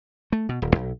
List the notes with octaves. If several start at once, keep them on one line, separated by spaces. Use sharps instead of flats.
A3
B2
D#1
B1